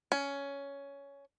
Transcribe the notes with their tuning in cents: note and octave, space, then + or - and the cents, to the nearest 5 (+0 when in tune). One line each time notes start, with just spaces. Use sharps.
C#4 +10